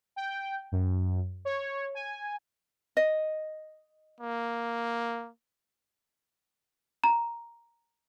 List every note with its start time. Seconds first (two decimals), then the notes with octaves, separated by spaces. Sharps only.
0.16 G5
0.72 F#2
1.45 C#5
1.95 G#5
2.97 D#5
4.21 A#3
7.04 A#5